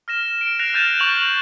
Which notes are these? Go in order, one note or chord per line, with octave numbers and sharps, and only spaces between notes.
F6 A#6 E7
D7
F#6 A#6 C7 D7 F7
F6 G6 A6 D#7 E7
C#6 F#6 F7 F#7